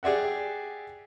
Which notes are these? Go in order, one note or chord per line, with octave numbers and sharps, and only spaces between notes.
G4 G#4 D5 E5 F#5